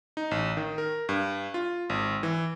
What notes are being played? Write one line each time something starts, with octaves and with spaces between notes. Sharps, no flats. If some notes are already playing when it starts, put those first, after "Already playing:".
D#4
A1
D#3
A#4
G2
F4
G#1
E3